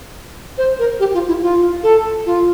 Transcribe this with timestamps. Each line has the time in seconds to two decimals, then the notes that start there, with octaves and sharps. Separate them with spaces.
0.58 C5
0.79 A#4
1.00 G4
1.14 F4
1.28 E4
1.42 F4
1.83 A4
2.26 F4